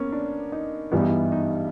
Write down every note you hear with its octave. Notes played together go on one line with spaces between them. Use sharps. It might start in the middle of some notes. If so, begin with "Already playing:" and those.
Already playing: A#3 B3 C#4
D4
D#4
G2 E3 G3 B3 E4
D#4
E4
D#4